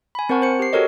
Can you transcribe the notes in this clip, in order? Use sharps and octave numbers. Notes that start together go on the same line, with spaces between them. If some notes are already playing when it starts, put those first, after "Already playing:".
G#5 B5
C4 A#4 C5 F#5 A5 C#6
C5 C#7
G4 C7
F#4 G4 A4 A#4 C#5 D#5